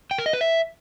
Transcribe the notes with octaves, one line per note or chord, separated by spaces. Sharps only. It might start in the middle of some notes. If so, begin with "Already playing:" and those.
G5
A#4
D#5
B4
E5